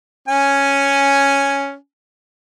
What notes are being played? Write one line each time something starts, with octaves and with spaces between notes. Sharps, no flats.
C#4 G#5